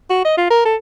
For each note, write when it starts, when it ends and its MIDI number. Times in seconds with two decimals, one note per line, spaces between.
0.10 0.22 66
0.25 0.34 75
0.37 0.47 65
0.50 0.64 70
0.65 0.76 69